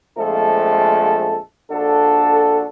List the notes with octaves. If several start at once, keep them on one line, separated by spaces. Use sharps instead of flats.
A#1 F2 F3 G#3 A3 A4
A#1 D4 F#4 A4